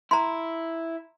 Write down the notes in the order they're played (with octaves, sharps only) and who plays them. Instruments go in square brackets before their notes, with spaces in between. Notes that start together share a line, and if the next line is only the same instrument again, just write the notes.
[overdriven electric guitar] E4 [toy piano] A#5 C6